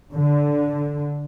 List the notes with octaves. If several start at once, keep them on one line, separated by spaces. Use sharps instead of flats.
D3